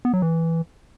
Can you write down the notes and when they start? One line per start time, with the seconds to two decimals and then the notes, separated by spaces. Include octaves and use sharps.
0.05 B3
0.13 F#3
0.22 E3